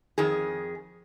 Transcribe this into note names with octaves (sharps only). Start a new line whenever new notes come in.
F2 D#3 G#4